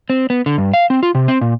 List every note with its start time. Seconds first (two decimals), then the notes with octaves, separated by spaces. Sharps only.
0.10 C4
0.30 B3
0.46 D3
0.58 G2
0.73 F5
0.90 C4
1.03 F4
1.15 C3
1.28 C4
1.41 A#2